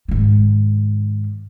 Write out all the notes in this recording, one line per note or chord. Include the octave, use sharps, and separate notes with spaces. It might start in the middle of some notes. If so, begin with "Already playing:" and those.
G#2 D#3